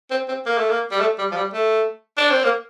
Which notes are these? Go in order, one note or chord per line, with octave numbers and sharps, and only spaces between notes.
C4
C4
A#3
A3
A#3
G3
A3
G3
F3
G3
A3
D4
C4
A#3